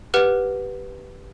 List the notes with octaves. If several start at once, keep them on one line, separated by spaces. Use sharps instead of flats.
G4 B4 F#5 F6